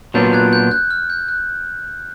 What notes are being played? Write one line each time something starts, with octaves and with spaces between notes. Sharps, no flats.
A#2 F#3 B3 D4 F4 G6
F#6 G#6
G6
F#6
F6
G6
F#6